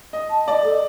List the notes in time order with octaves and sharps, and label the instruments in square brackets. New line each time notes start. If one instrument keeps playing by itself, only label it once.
[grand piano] D#5
[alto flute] A5
[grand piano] D5 [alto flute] D#5
[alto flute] A4